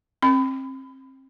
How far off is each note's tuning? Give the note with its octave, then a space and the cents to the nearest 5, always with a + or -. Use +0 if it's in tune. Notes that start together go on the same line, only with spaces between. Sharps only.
C4 +35 B5 +30